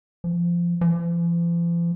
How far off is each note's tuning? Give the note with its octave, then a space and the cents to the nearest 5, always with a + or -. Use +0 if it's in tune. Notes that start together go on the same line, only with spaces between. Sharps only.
F3 -15
F3 -45